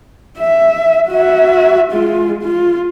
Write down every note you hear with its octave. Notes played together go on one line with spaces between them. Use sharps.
E5
F#4 E5
G#3 F4
F4